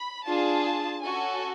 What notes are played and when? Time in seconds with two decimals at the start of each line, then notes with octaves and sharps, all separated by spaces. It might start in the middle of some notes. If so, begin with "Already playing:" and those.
Already playing: B5
0.25 D4 F4 G#4 A5
1.02 C#4 F#4 A4 G#5